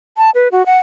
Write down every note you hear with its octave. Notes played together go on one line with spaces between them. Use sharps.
A5
B4
F#4
F#5